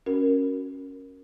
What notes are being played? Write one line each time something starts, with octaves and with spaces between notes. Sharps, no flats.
C#4 F#4 A#4